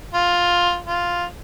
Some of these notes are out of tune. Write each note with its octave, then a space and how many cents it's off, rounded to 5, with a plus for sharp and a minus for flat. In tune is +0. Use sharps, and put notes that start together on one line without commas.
F4 +10
F4 +0